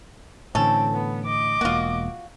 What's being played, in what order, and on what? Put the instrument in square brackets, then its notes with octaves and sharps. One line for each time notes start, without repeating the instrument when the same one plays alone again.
[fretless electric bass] A2 D3 E3 [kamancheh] C4 [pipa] C#4 A4
[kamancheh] B3
D#5 D6
[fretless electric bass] E1 A#3 [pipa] F4 F#4